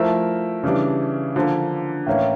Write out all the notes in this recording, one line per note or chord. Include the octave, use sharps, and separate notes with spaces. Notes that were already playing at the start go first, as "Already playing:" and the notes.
Already playing: F3 A3 E4 A#4 E5
C#3 E3 G3 D4
D3 F3 A#3
A2 E3 A#3 C#4